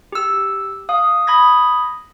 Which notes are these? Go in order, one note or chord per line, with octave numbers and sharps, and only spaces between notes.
G4 E6
F5 D#6
B5 D#6 G#6 A#6